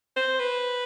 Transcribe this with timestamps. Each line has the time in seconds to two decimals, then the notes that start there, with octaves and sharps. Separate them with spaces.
0.16 C5
0.39 B4